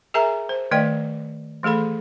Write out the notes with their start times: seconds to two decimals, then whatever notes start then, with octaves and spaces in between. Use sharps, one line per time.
0.14 G#4 A#4 E5 G#5 A#5
0.49 C5
0.71 D#3 A3 D5 D#5 G5
1.63 E3 A3 G#4 A4 B5